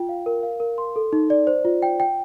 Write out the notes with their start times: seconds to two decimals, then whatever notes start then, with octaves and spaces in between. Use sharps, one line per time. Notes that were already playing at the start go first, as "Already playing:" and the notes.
Already playing: F4 G5
0.09 F5
0.26 A#4
0.43 F5
0.60 A#4
0.78 C6
0.96 A4
1.13 D#4
1.30 D5
1.47 C5
1.65 F4
1.82 G5
2.00 G5